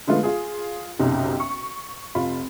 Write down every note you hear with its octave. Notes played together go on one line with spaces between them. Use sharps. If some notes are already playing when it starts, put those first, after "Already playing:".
D3 G#3 A3 B3 F4
F4 G#4
F#1 B1 C3 D#4
C#6
F1 F4 B5